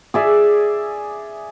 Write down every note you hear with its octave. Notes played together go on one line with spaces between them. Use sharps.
G#4 D5 E5